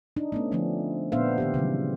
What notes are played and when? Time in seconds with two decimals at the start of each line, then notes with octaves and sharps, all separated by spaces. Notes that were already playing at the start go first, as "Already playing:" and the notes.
0.17 D4 D#4
0.32 A3 B3 C#4
0.52 D3 F3 A3 C4 D4
1.12 A#2 B3 D4 C5 E5 F5
1.38 D#3 B3 G4
1.54 C#3 E3 F#3 G3